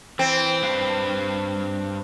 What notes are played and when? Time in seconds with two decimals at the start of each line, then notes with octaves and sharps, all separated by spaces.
0.19 E3 C4
0.63 G2 B4 F5